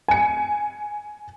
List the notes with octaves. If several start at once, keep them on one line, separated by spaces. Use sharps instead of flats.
G#5 C#7